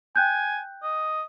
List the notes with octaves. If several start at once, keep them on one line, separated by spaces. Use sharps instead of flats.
G5 G#5 F#6 G6
D#5